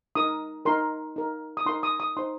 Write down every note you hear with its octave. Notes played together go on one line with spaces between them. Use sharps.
D#4 A#4 D#6
D#4 A#4 C6
D#4 A#4
D#6
D#4 A#4 C6
D#6
D#6
D#4 C5 C6